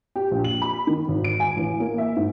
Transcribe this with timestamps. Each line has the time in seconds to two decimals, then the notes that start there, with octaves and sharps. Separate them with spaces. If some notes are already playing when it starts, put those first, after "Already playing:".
0.16 G4
0.31 A#1
0.45 F#7
0.62 B5
0.87 D#3
1.08 G#1
1.24 D7
1.40 G#5
1.57 A1
1.80 A#3
1.98 E5
2.16 G#2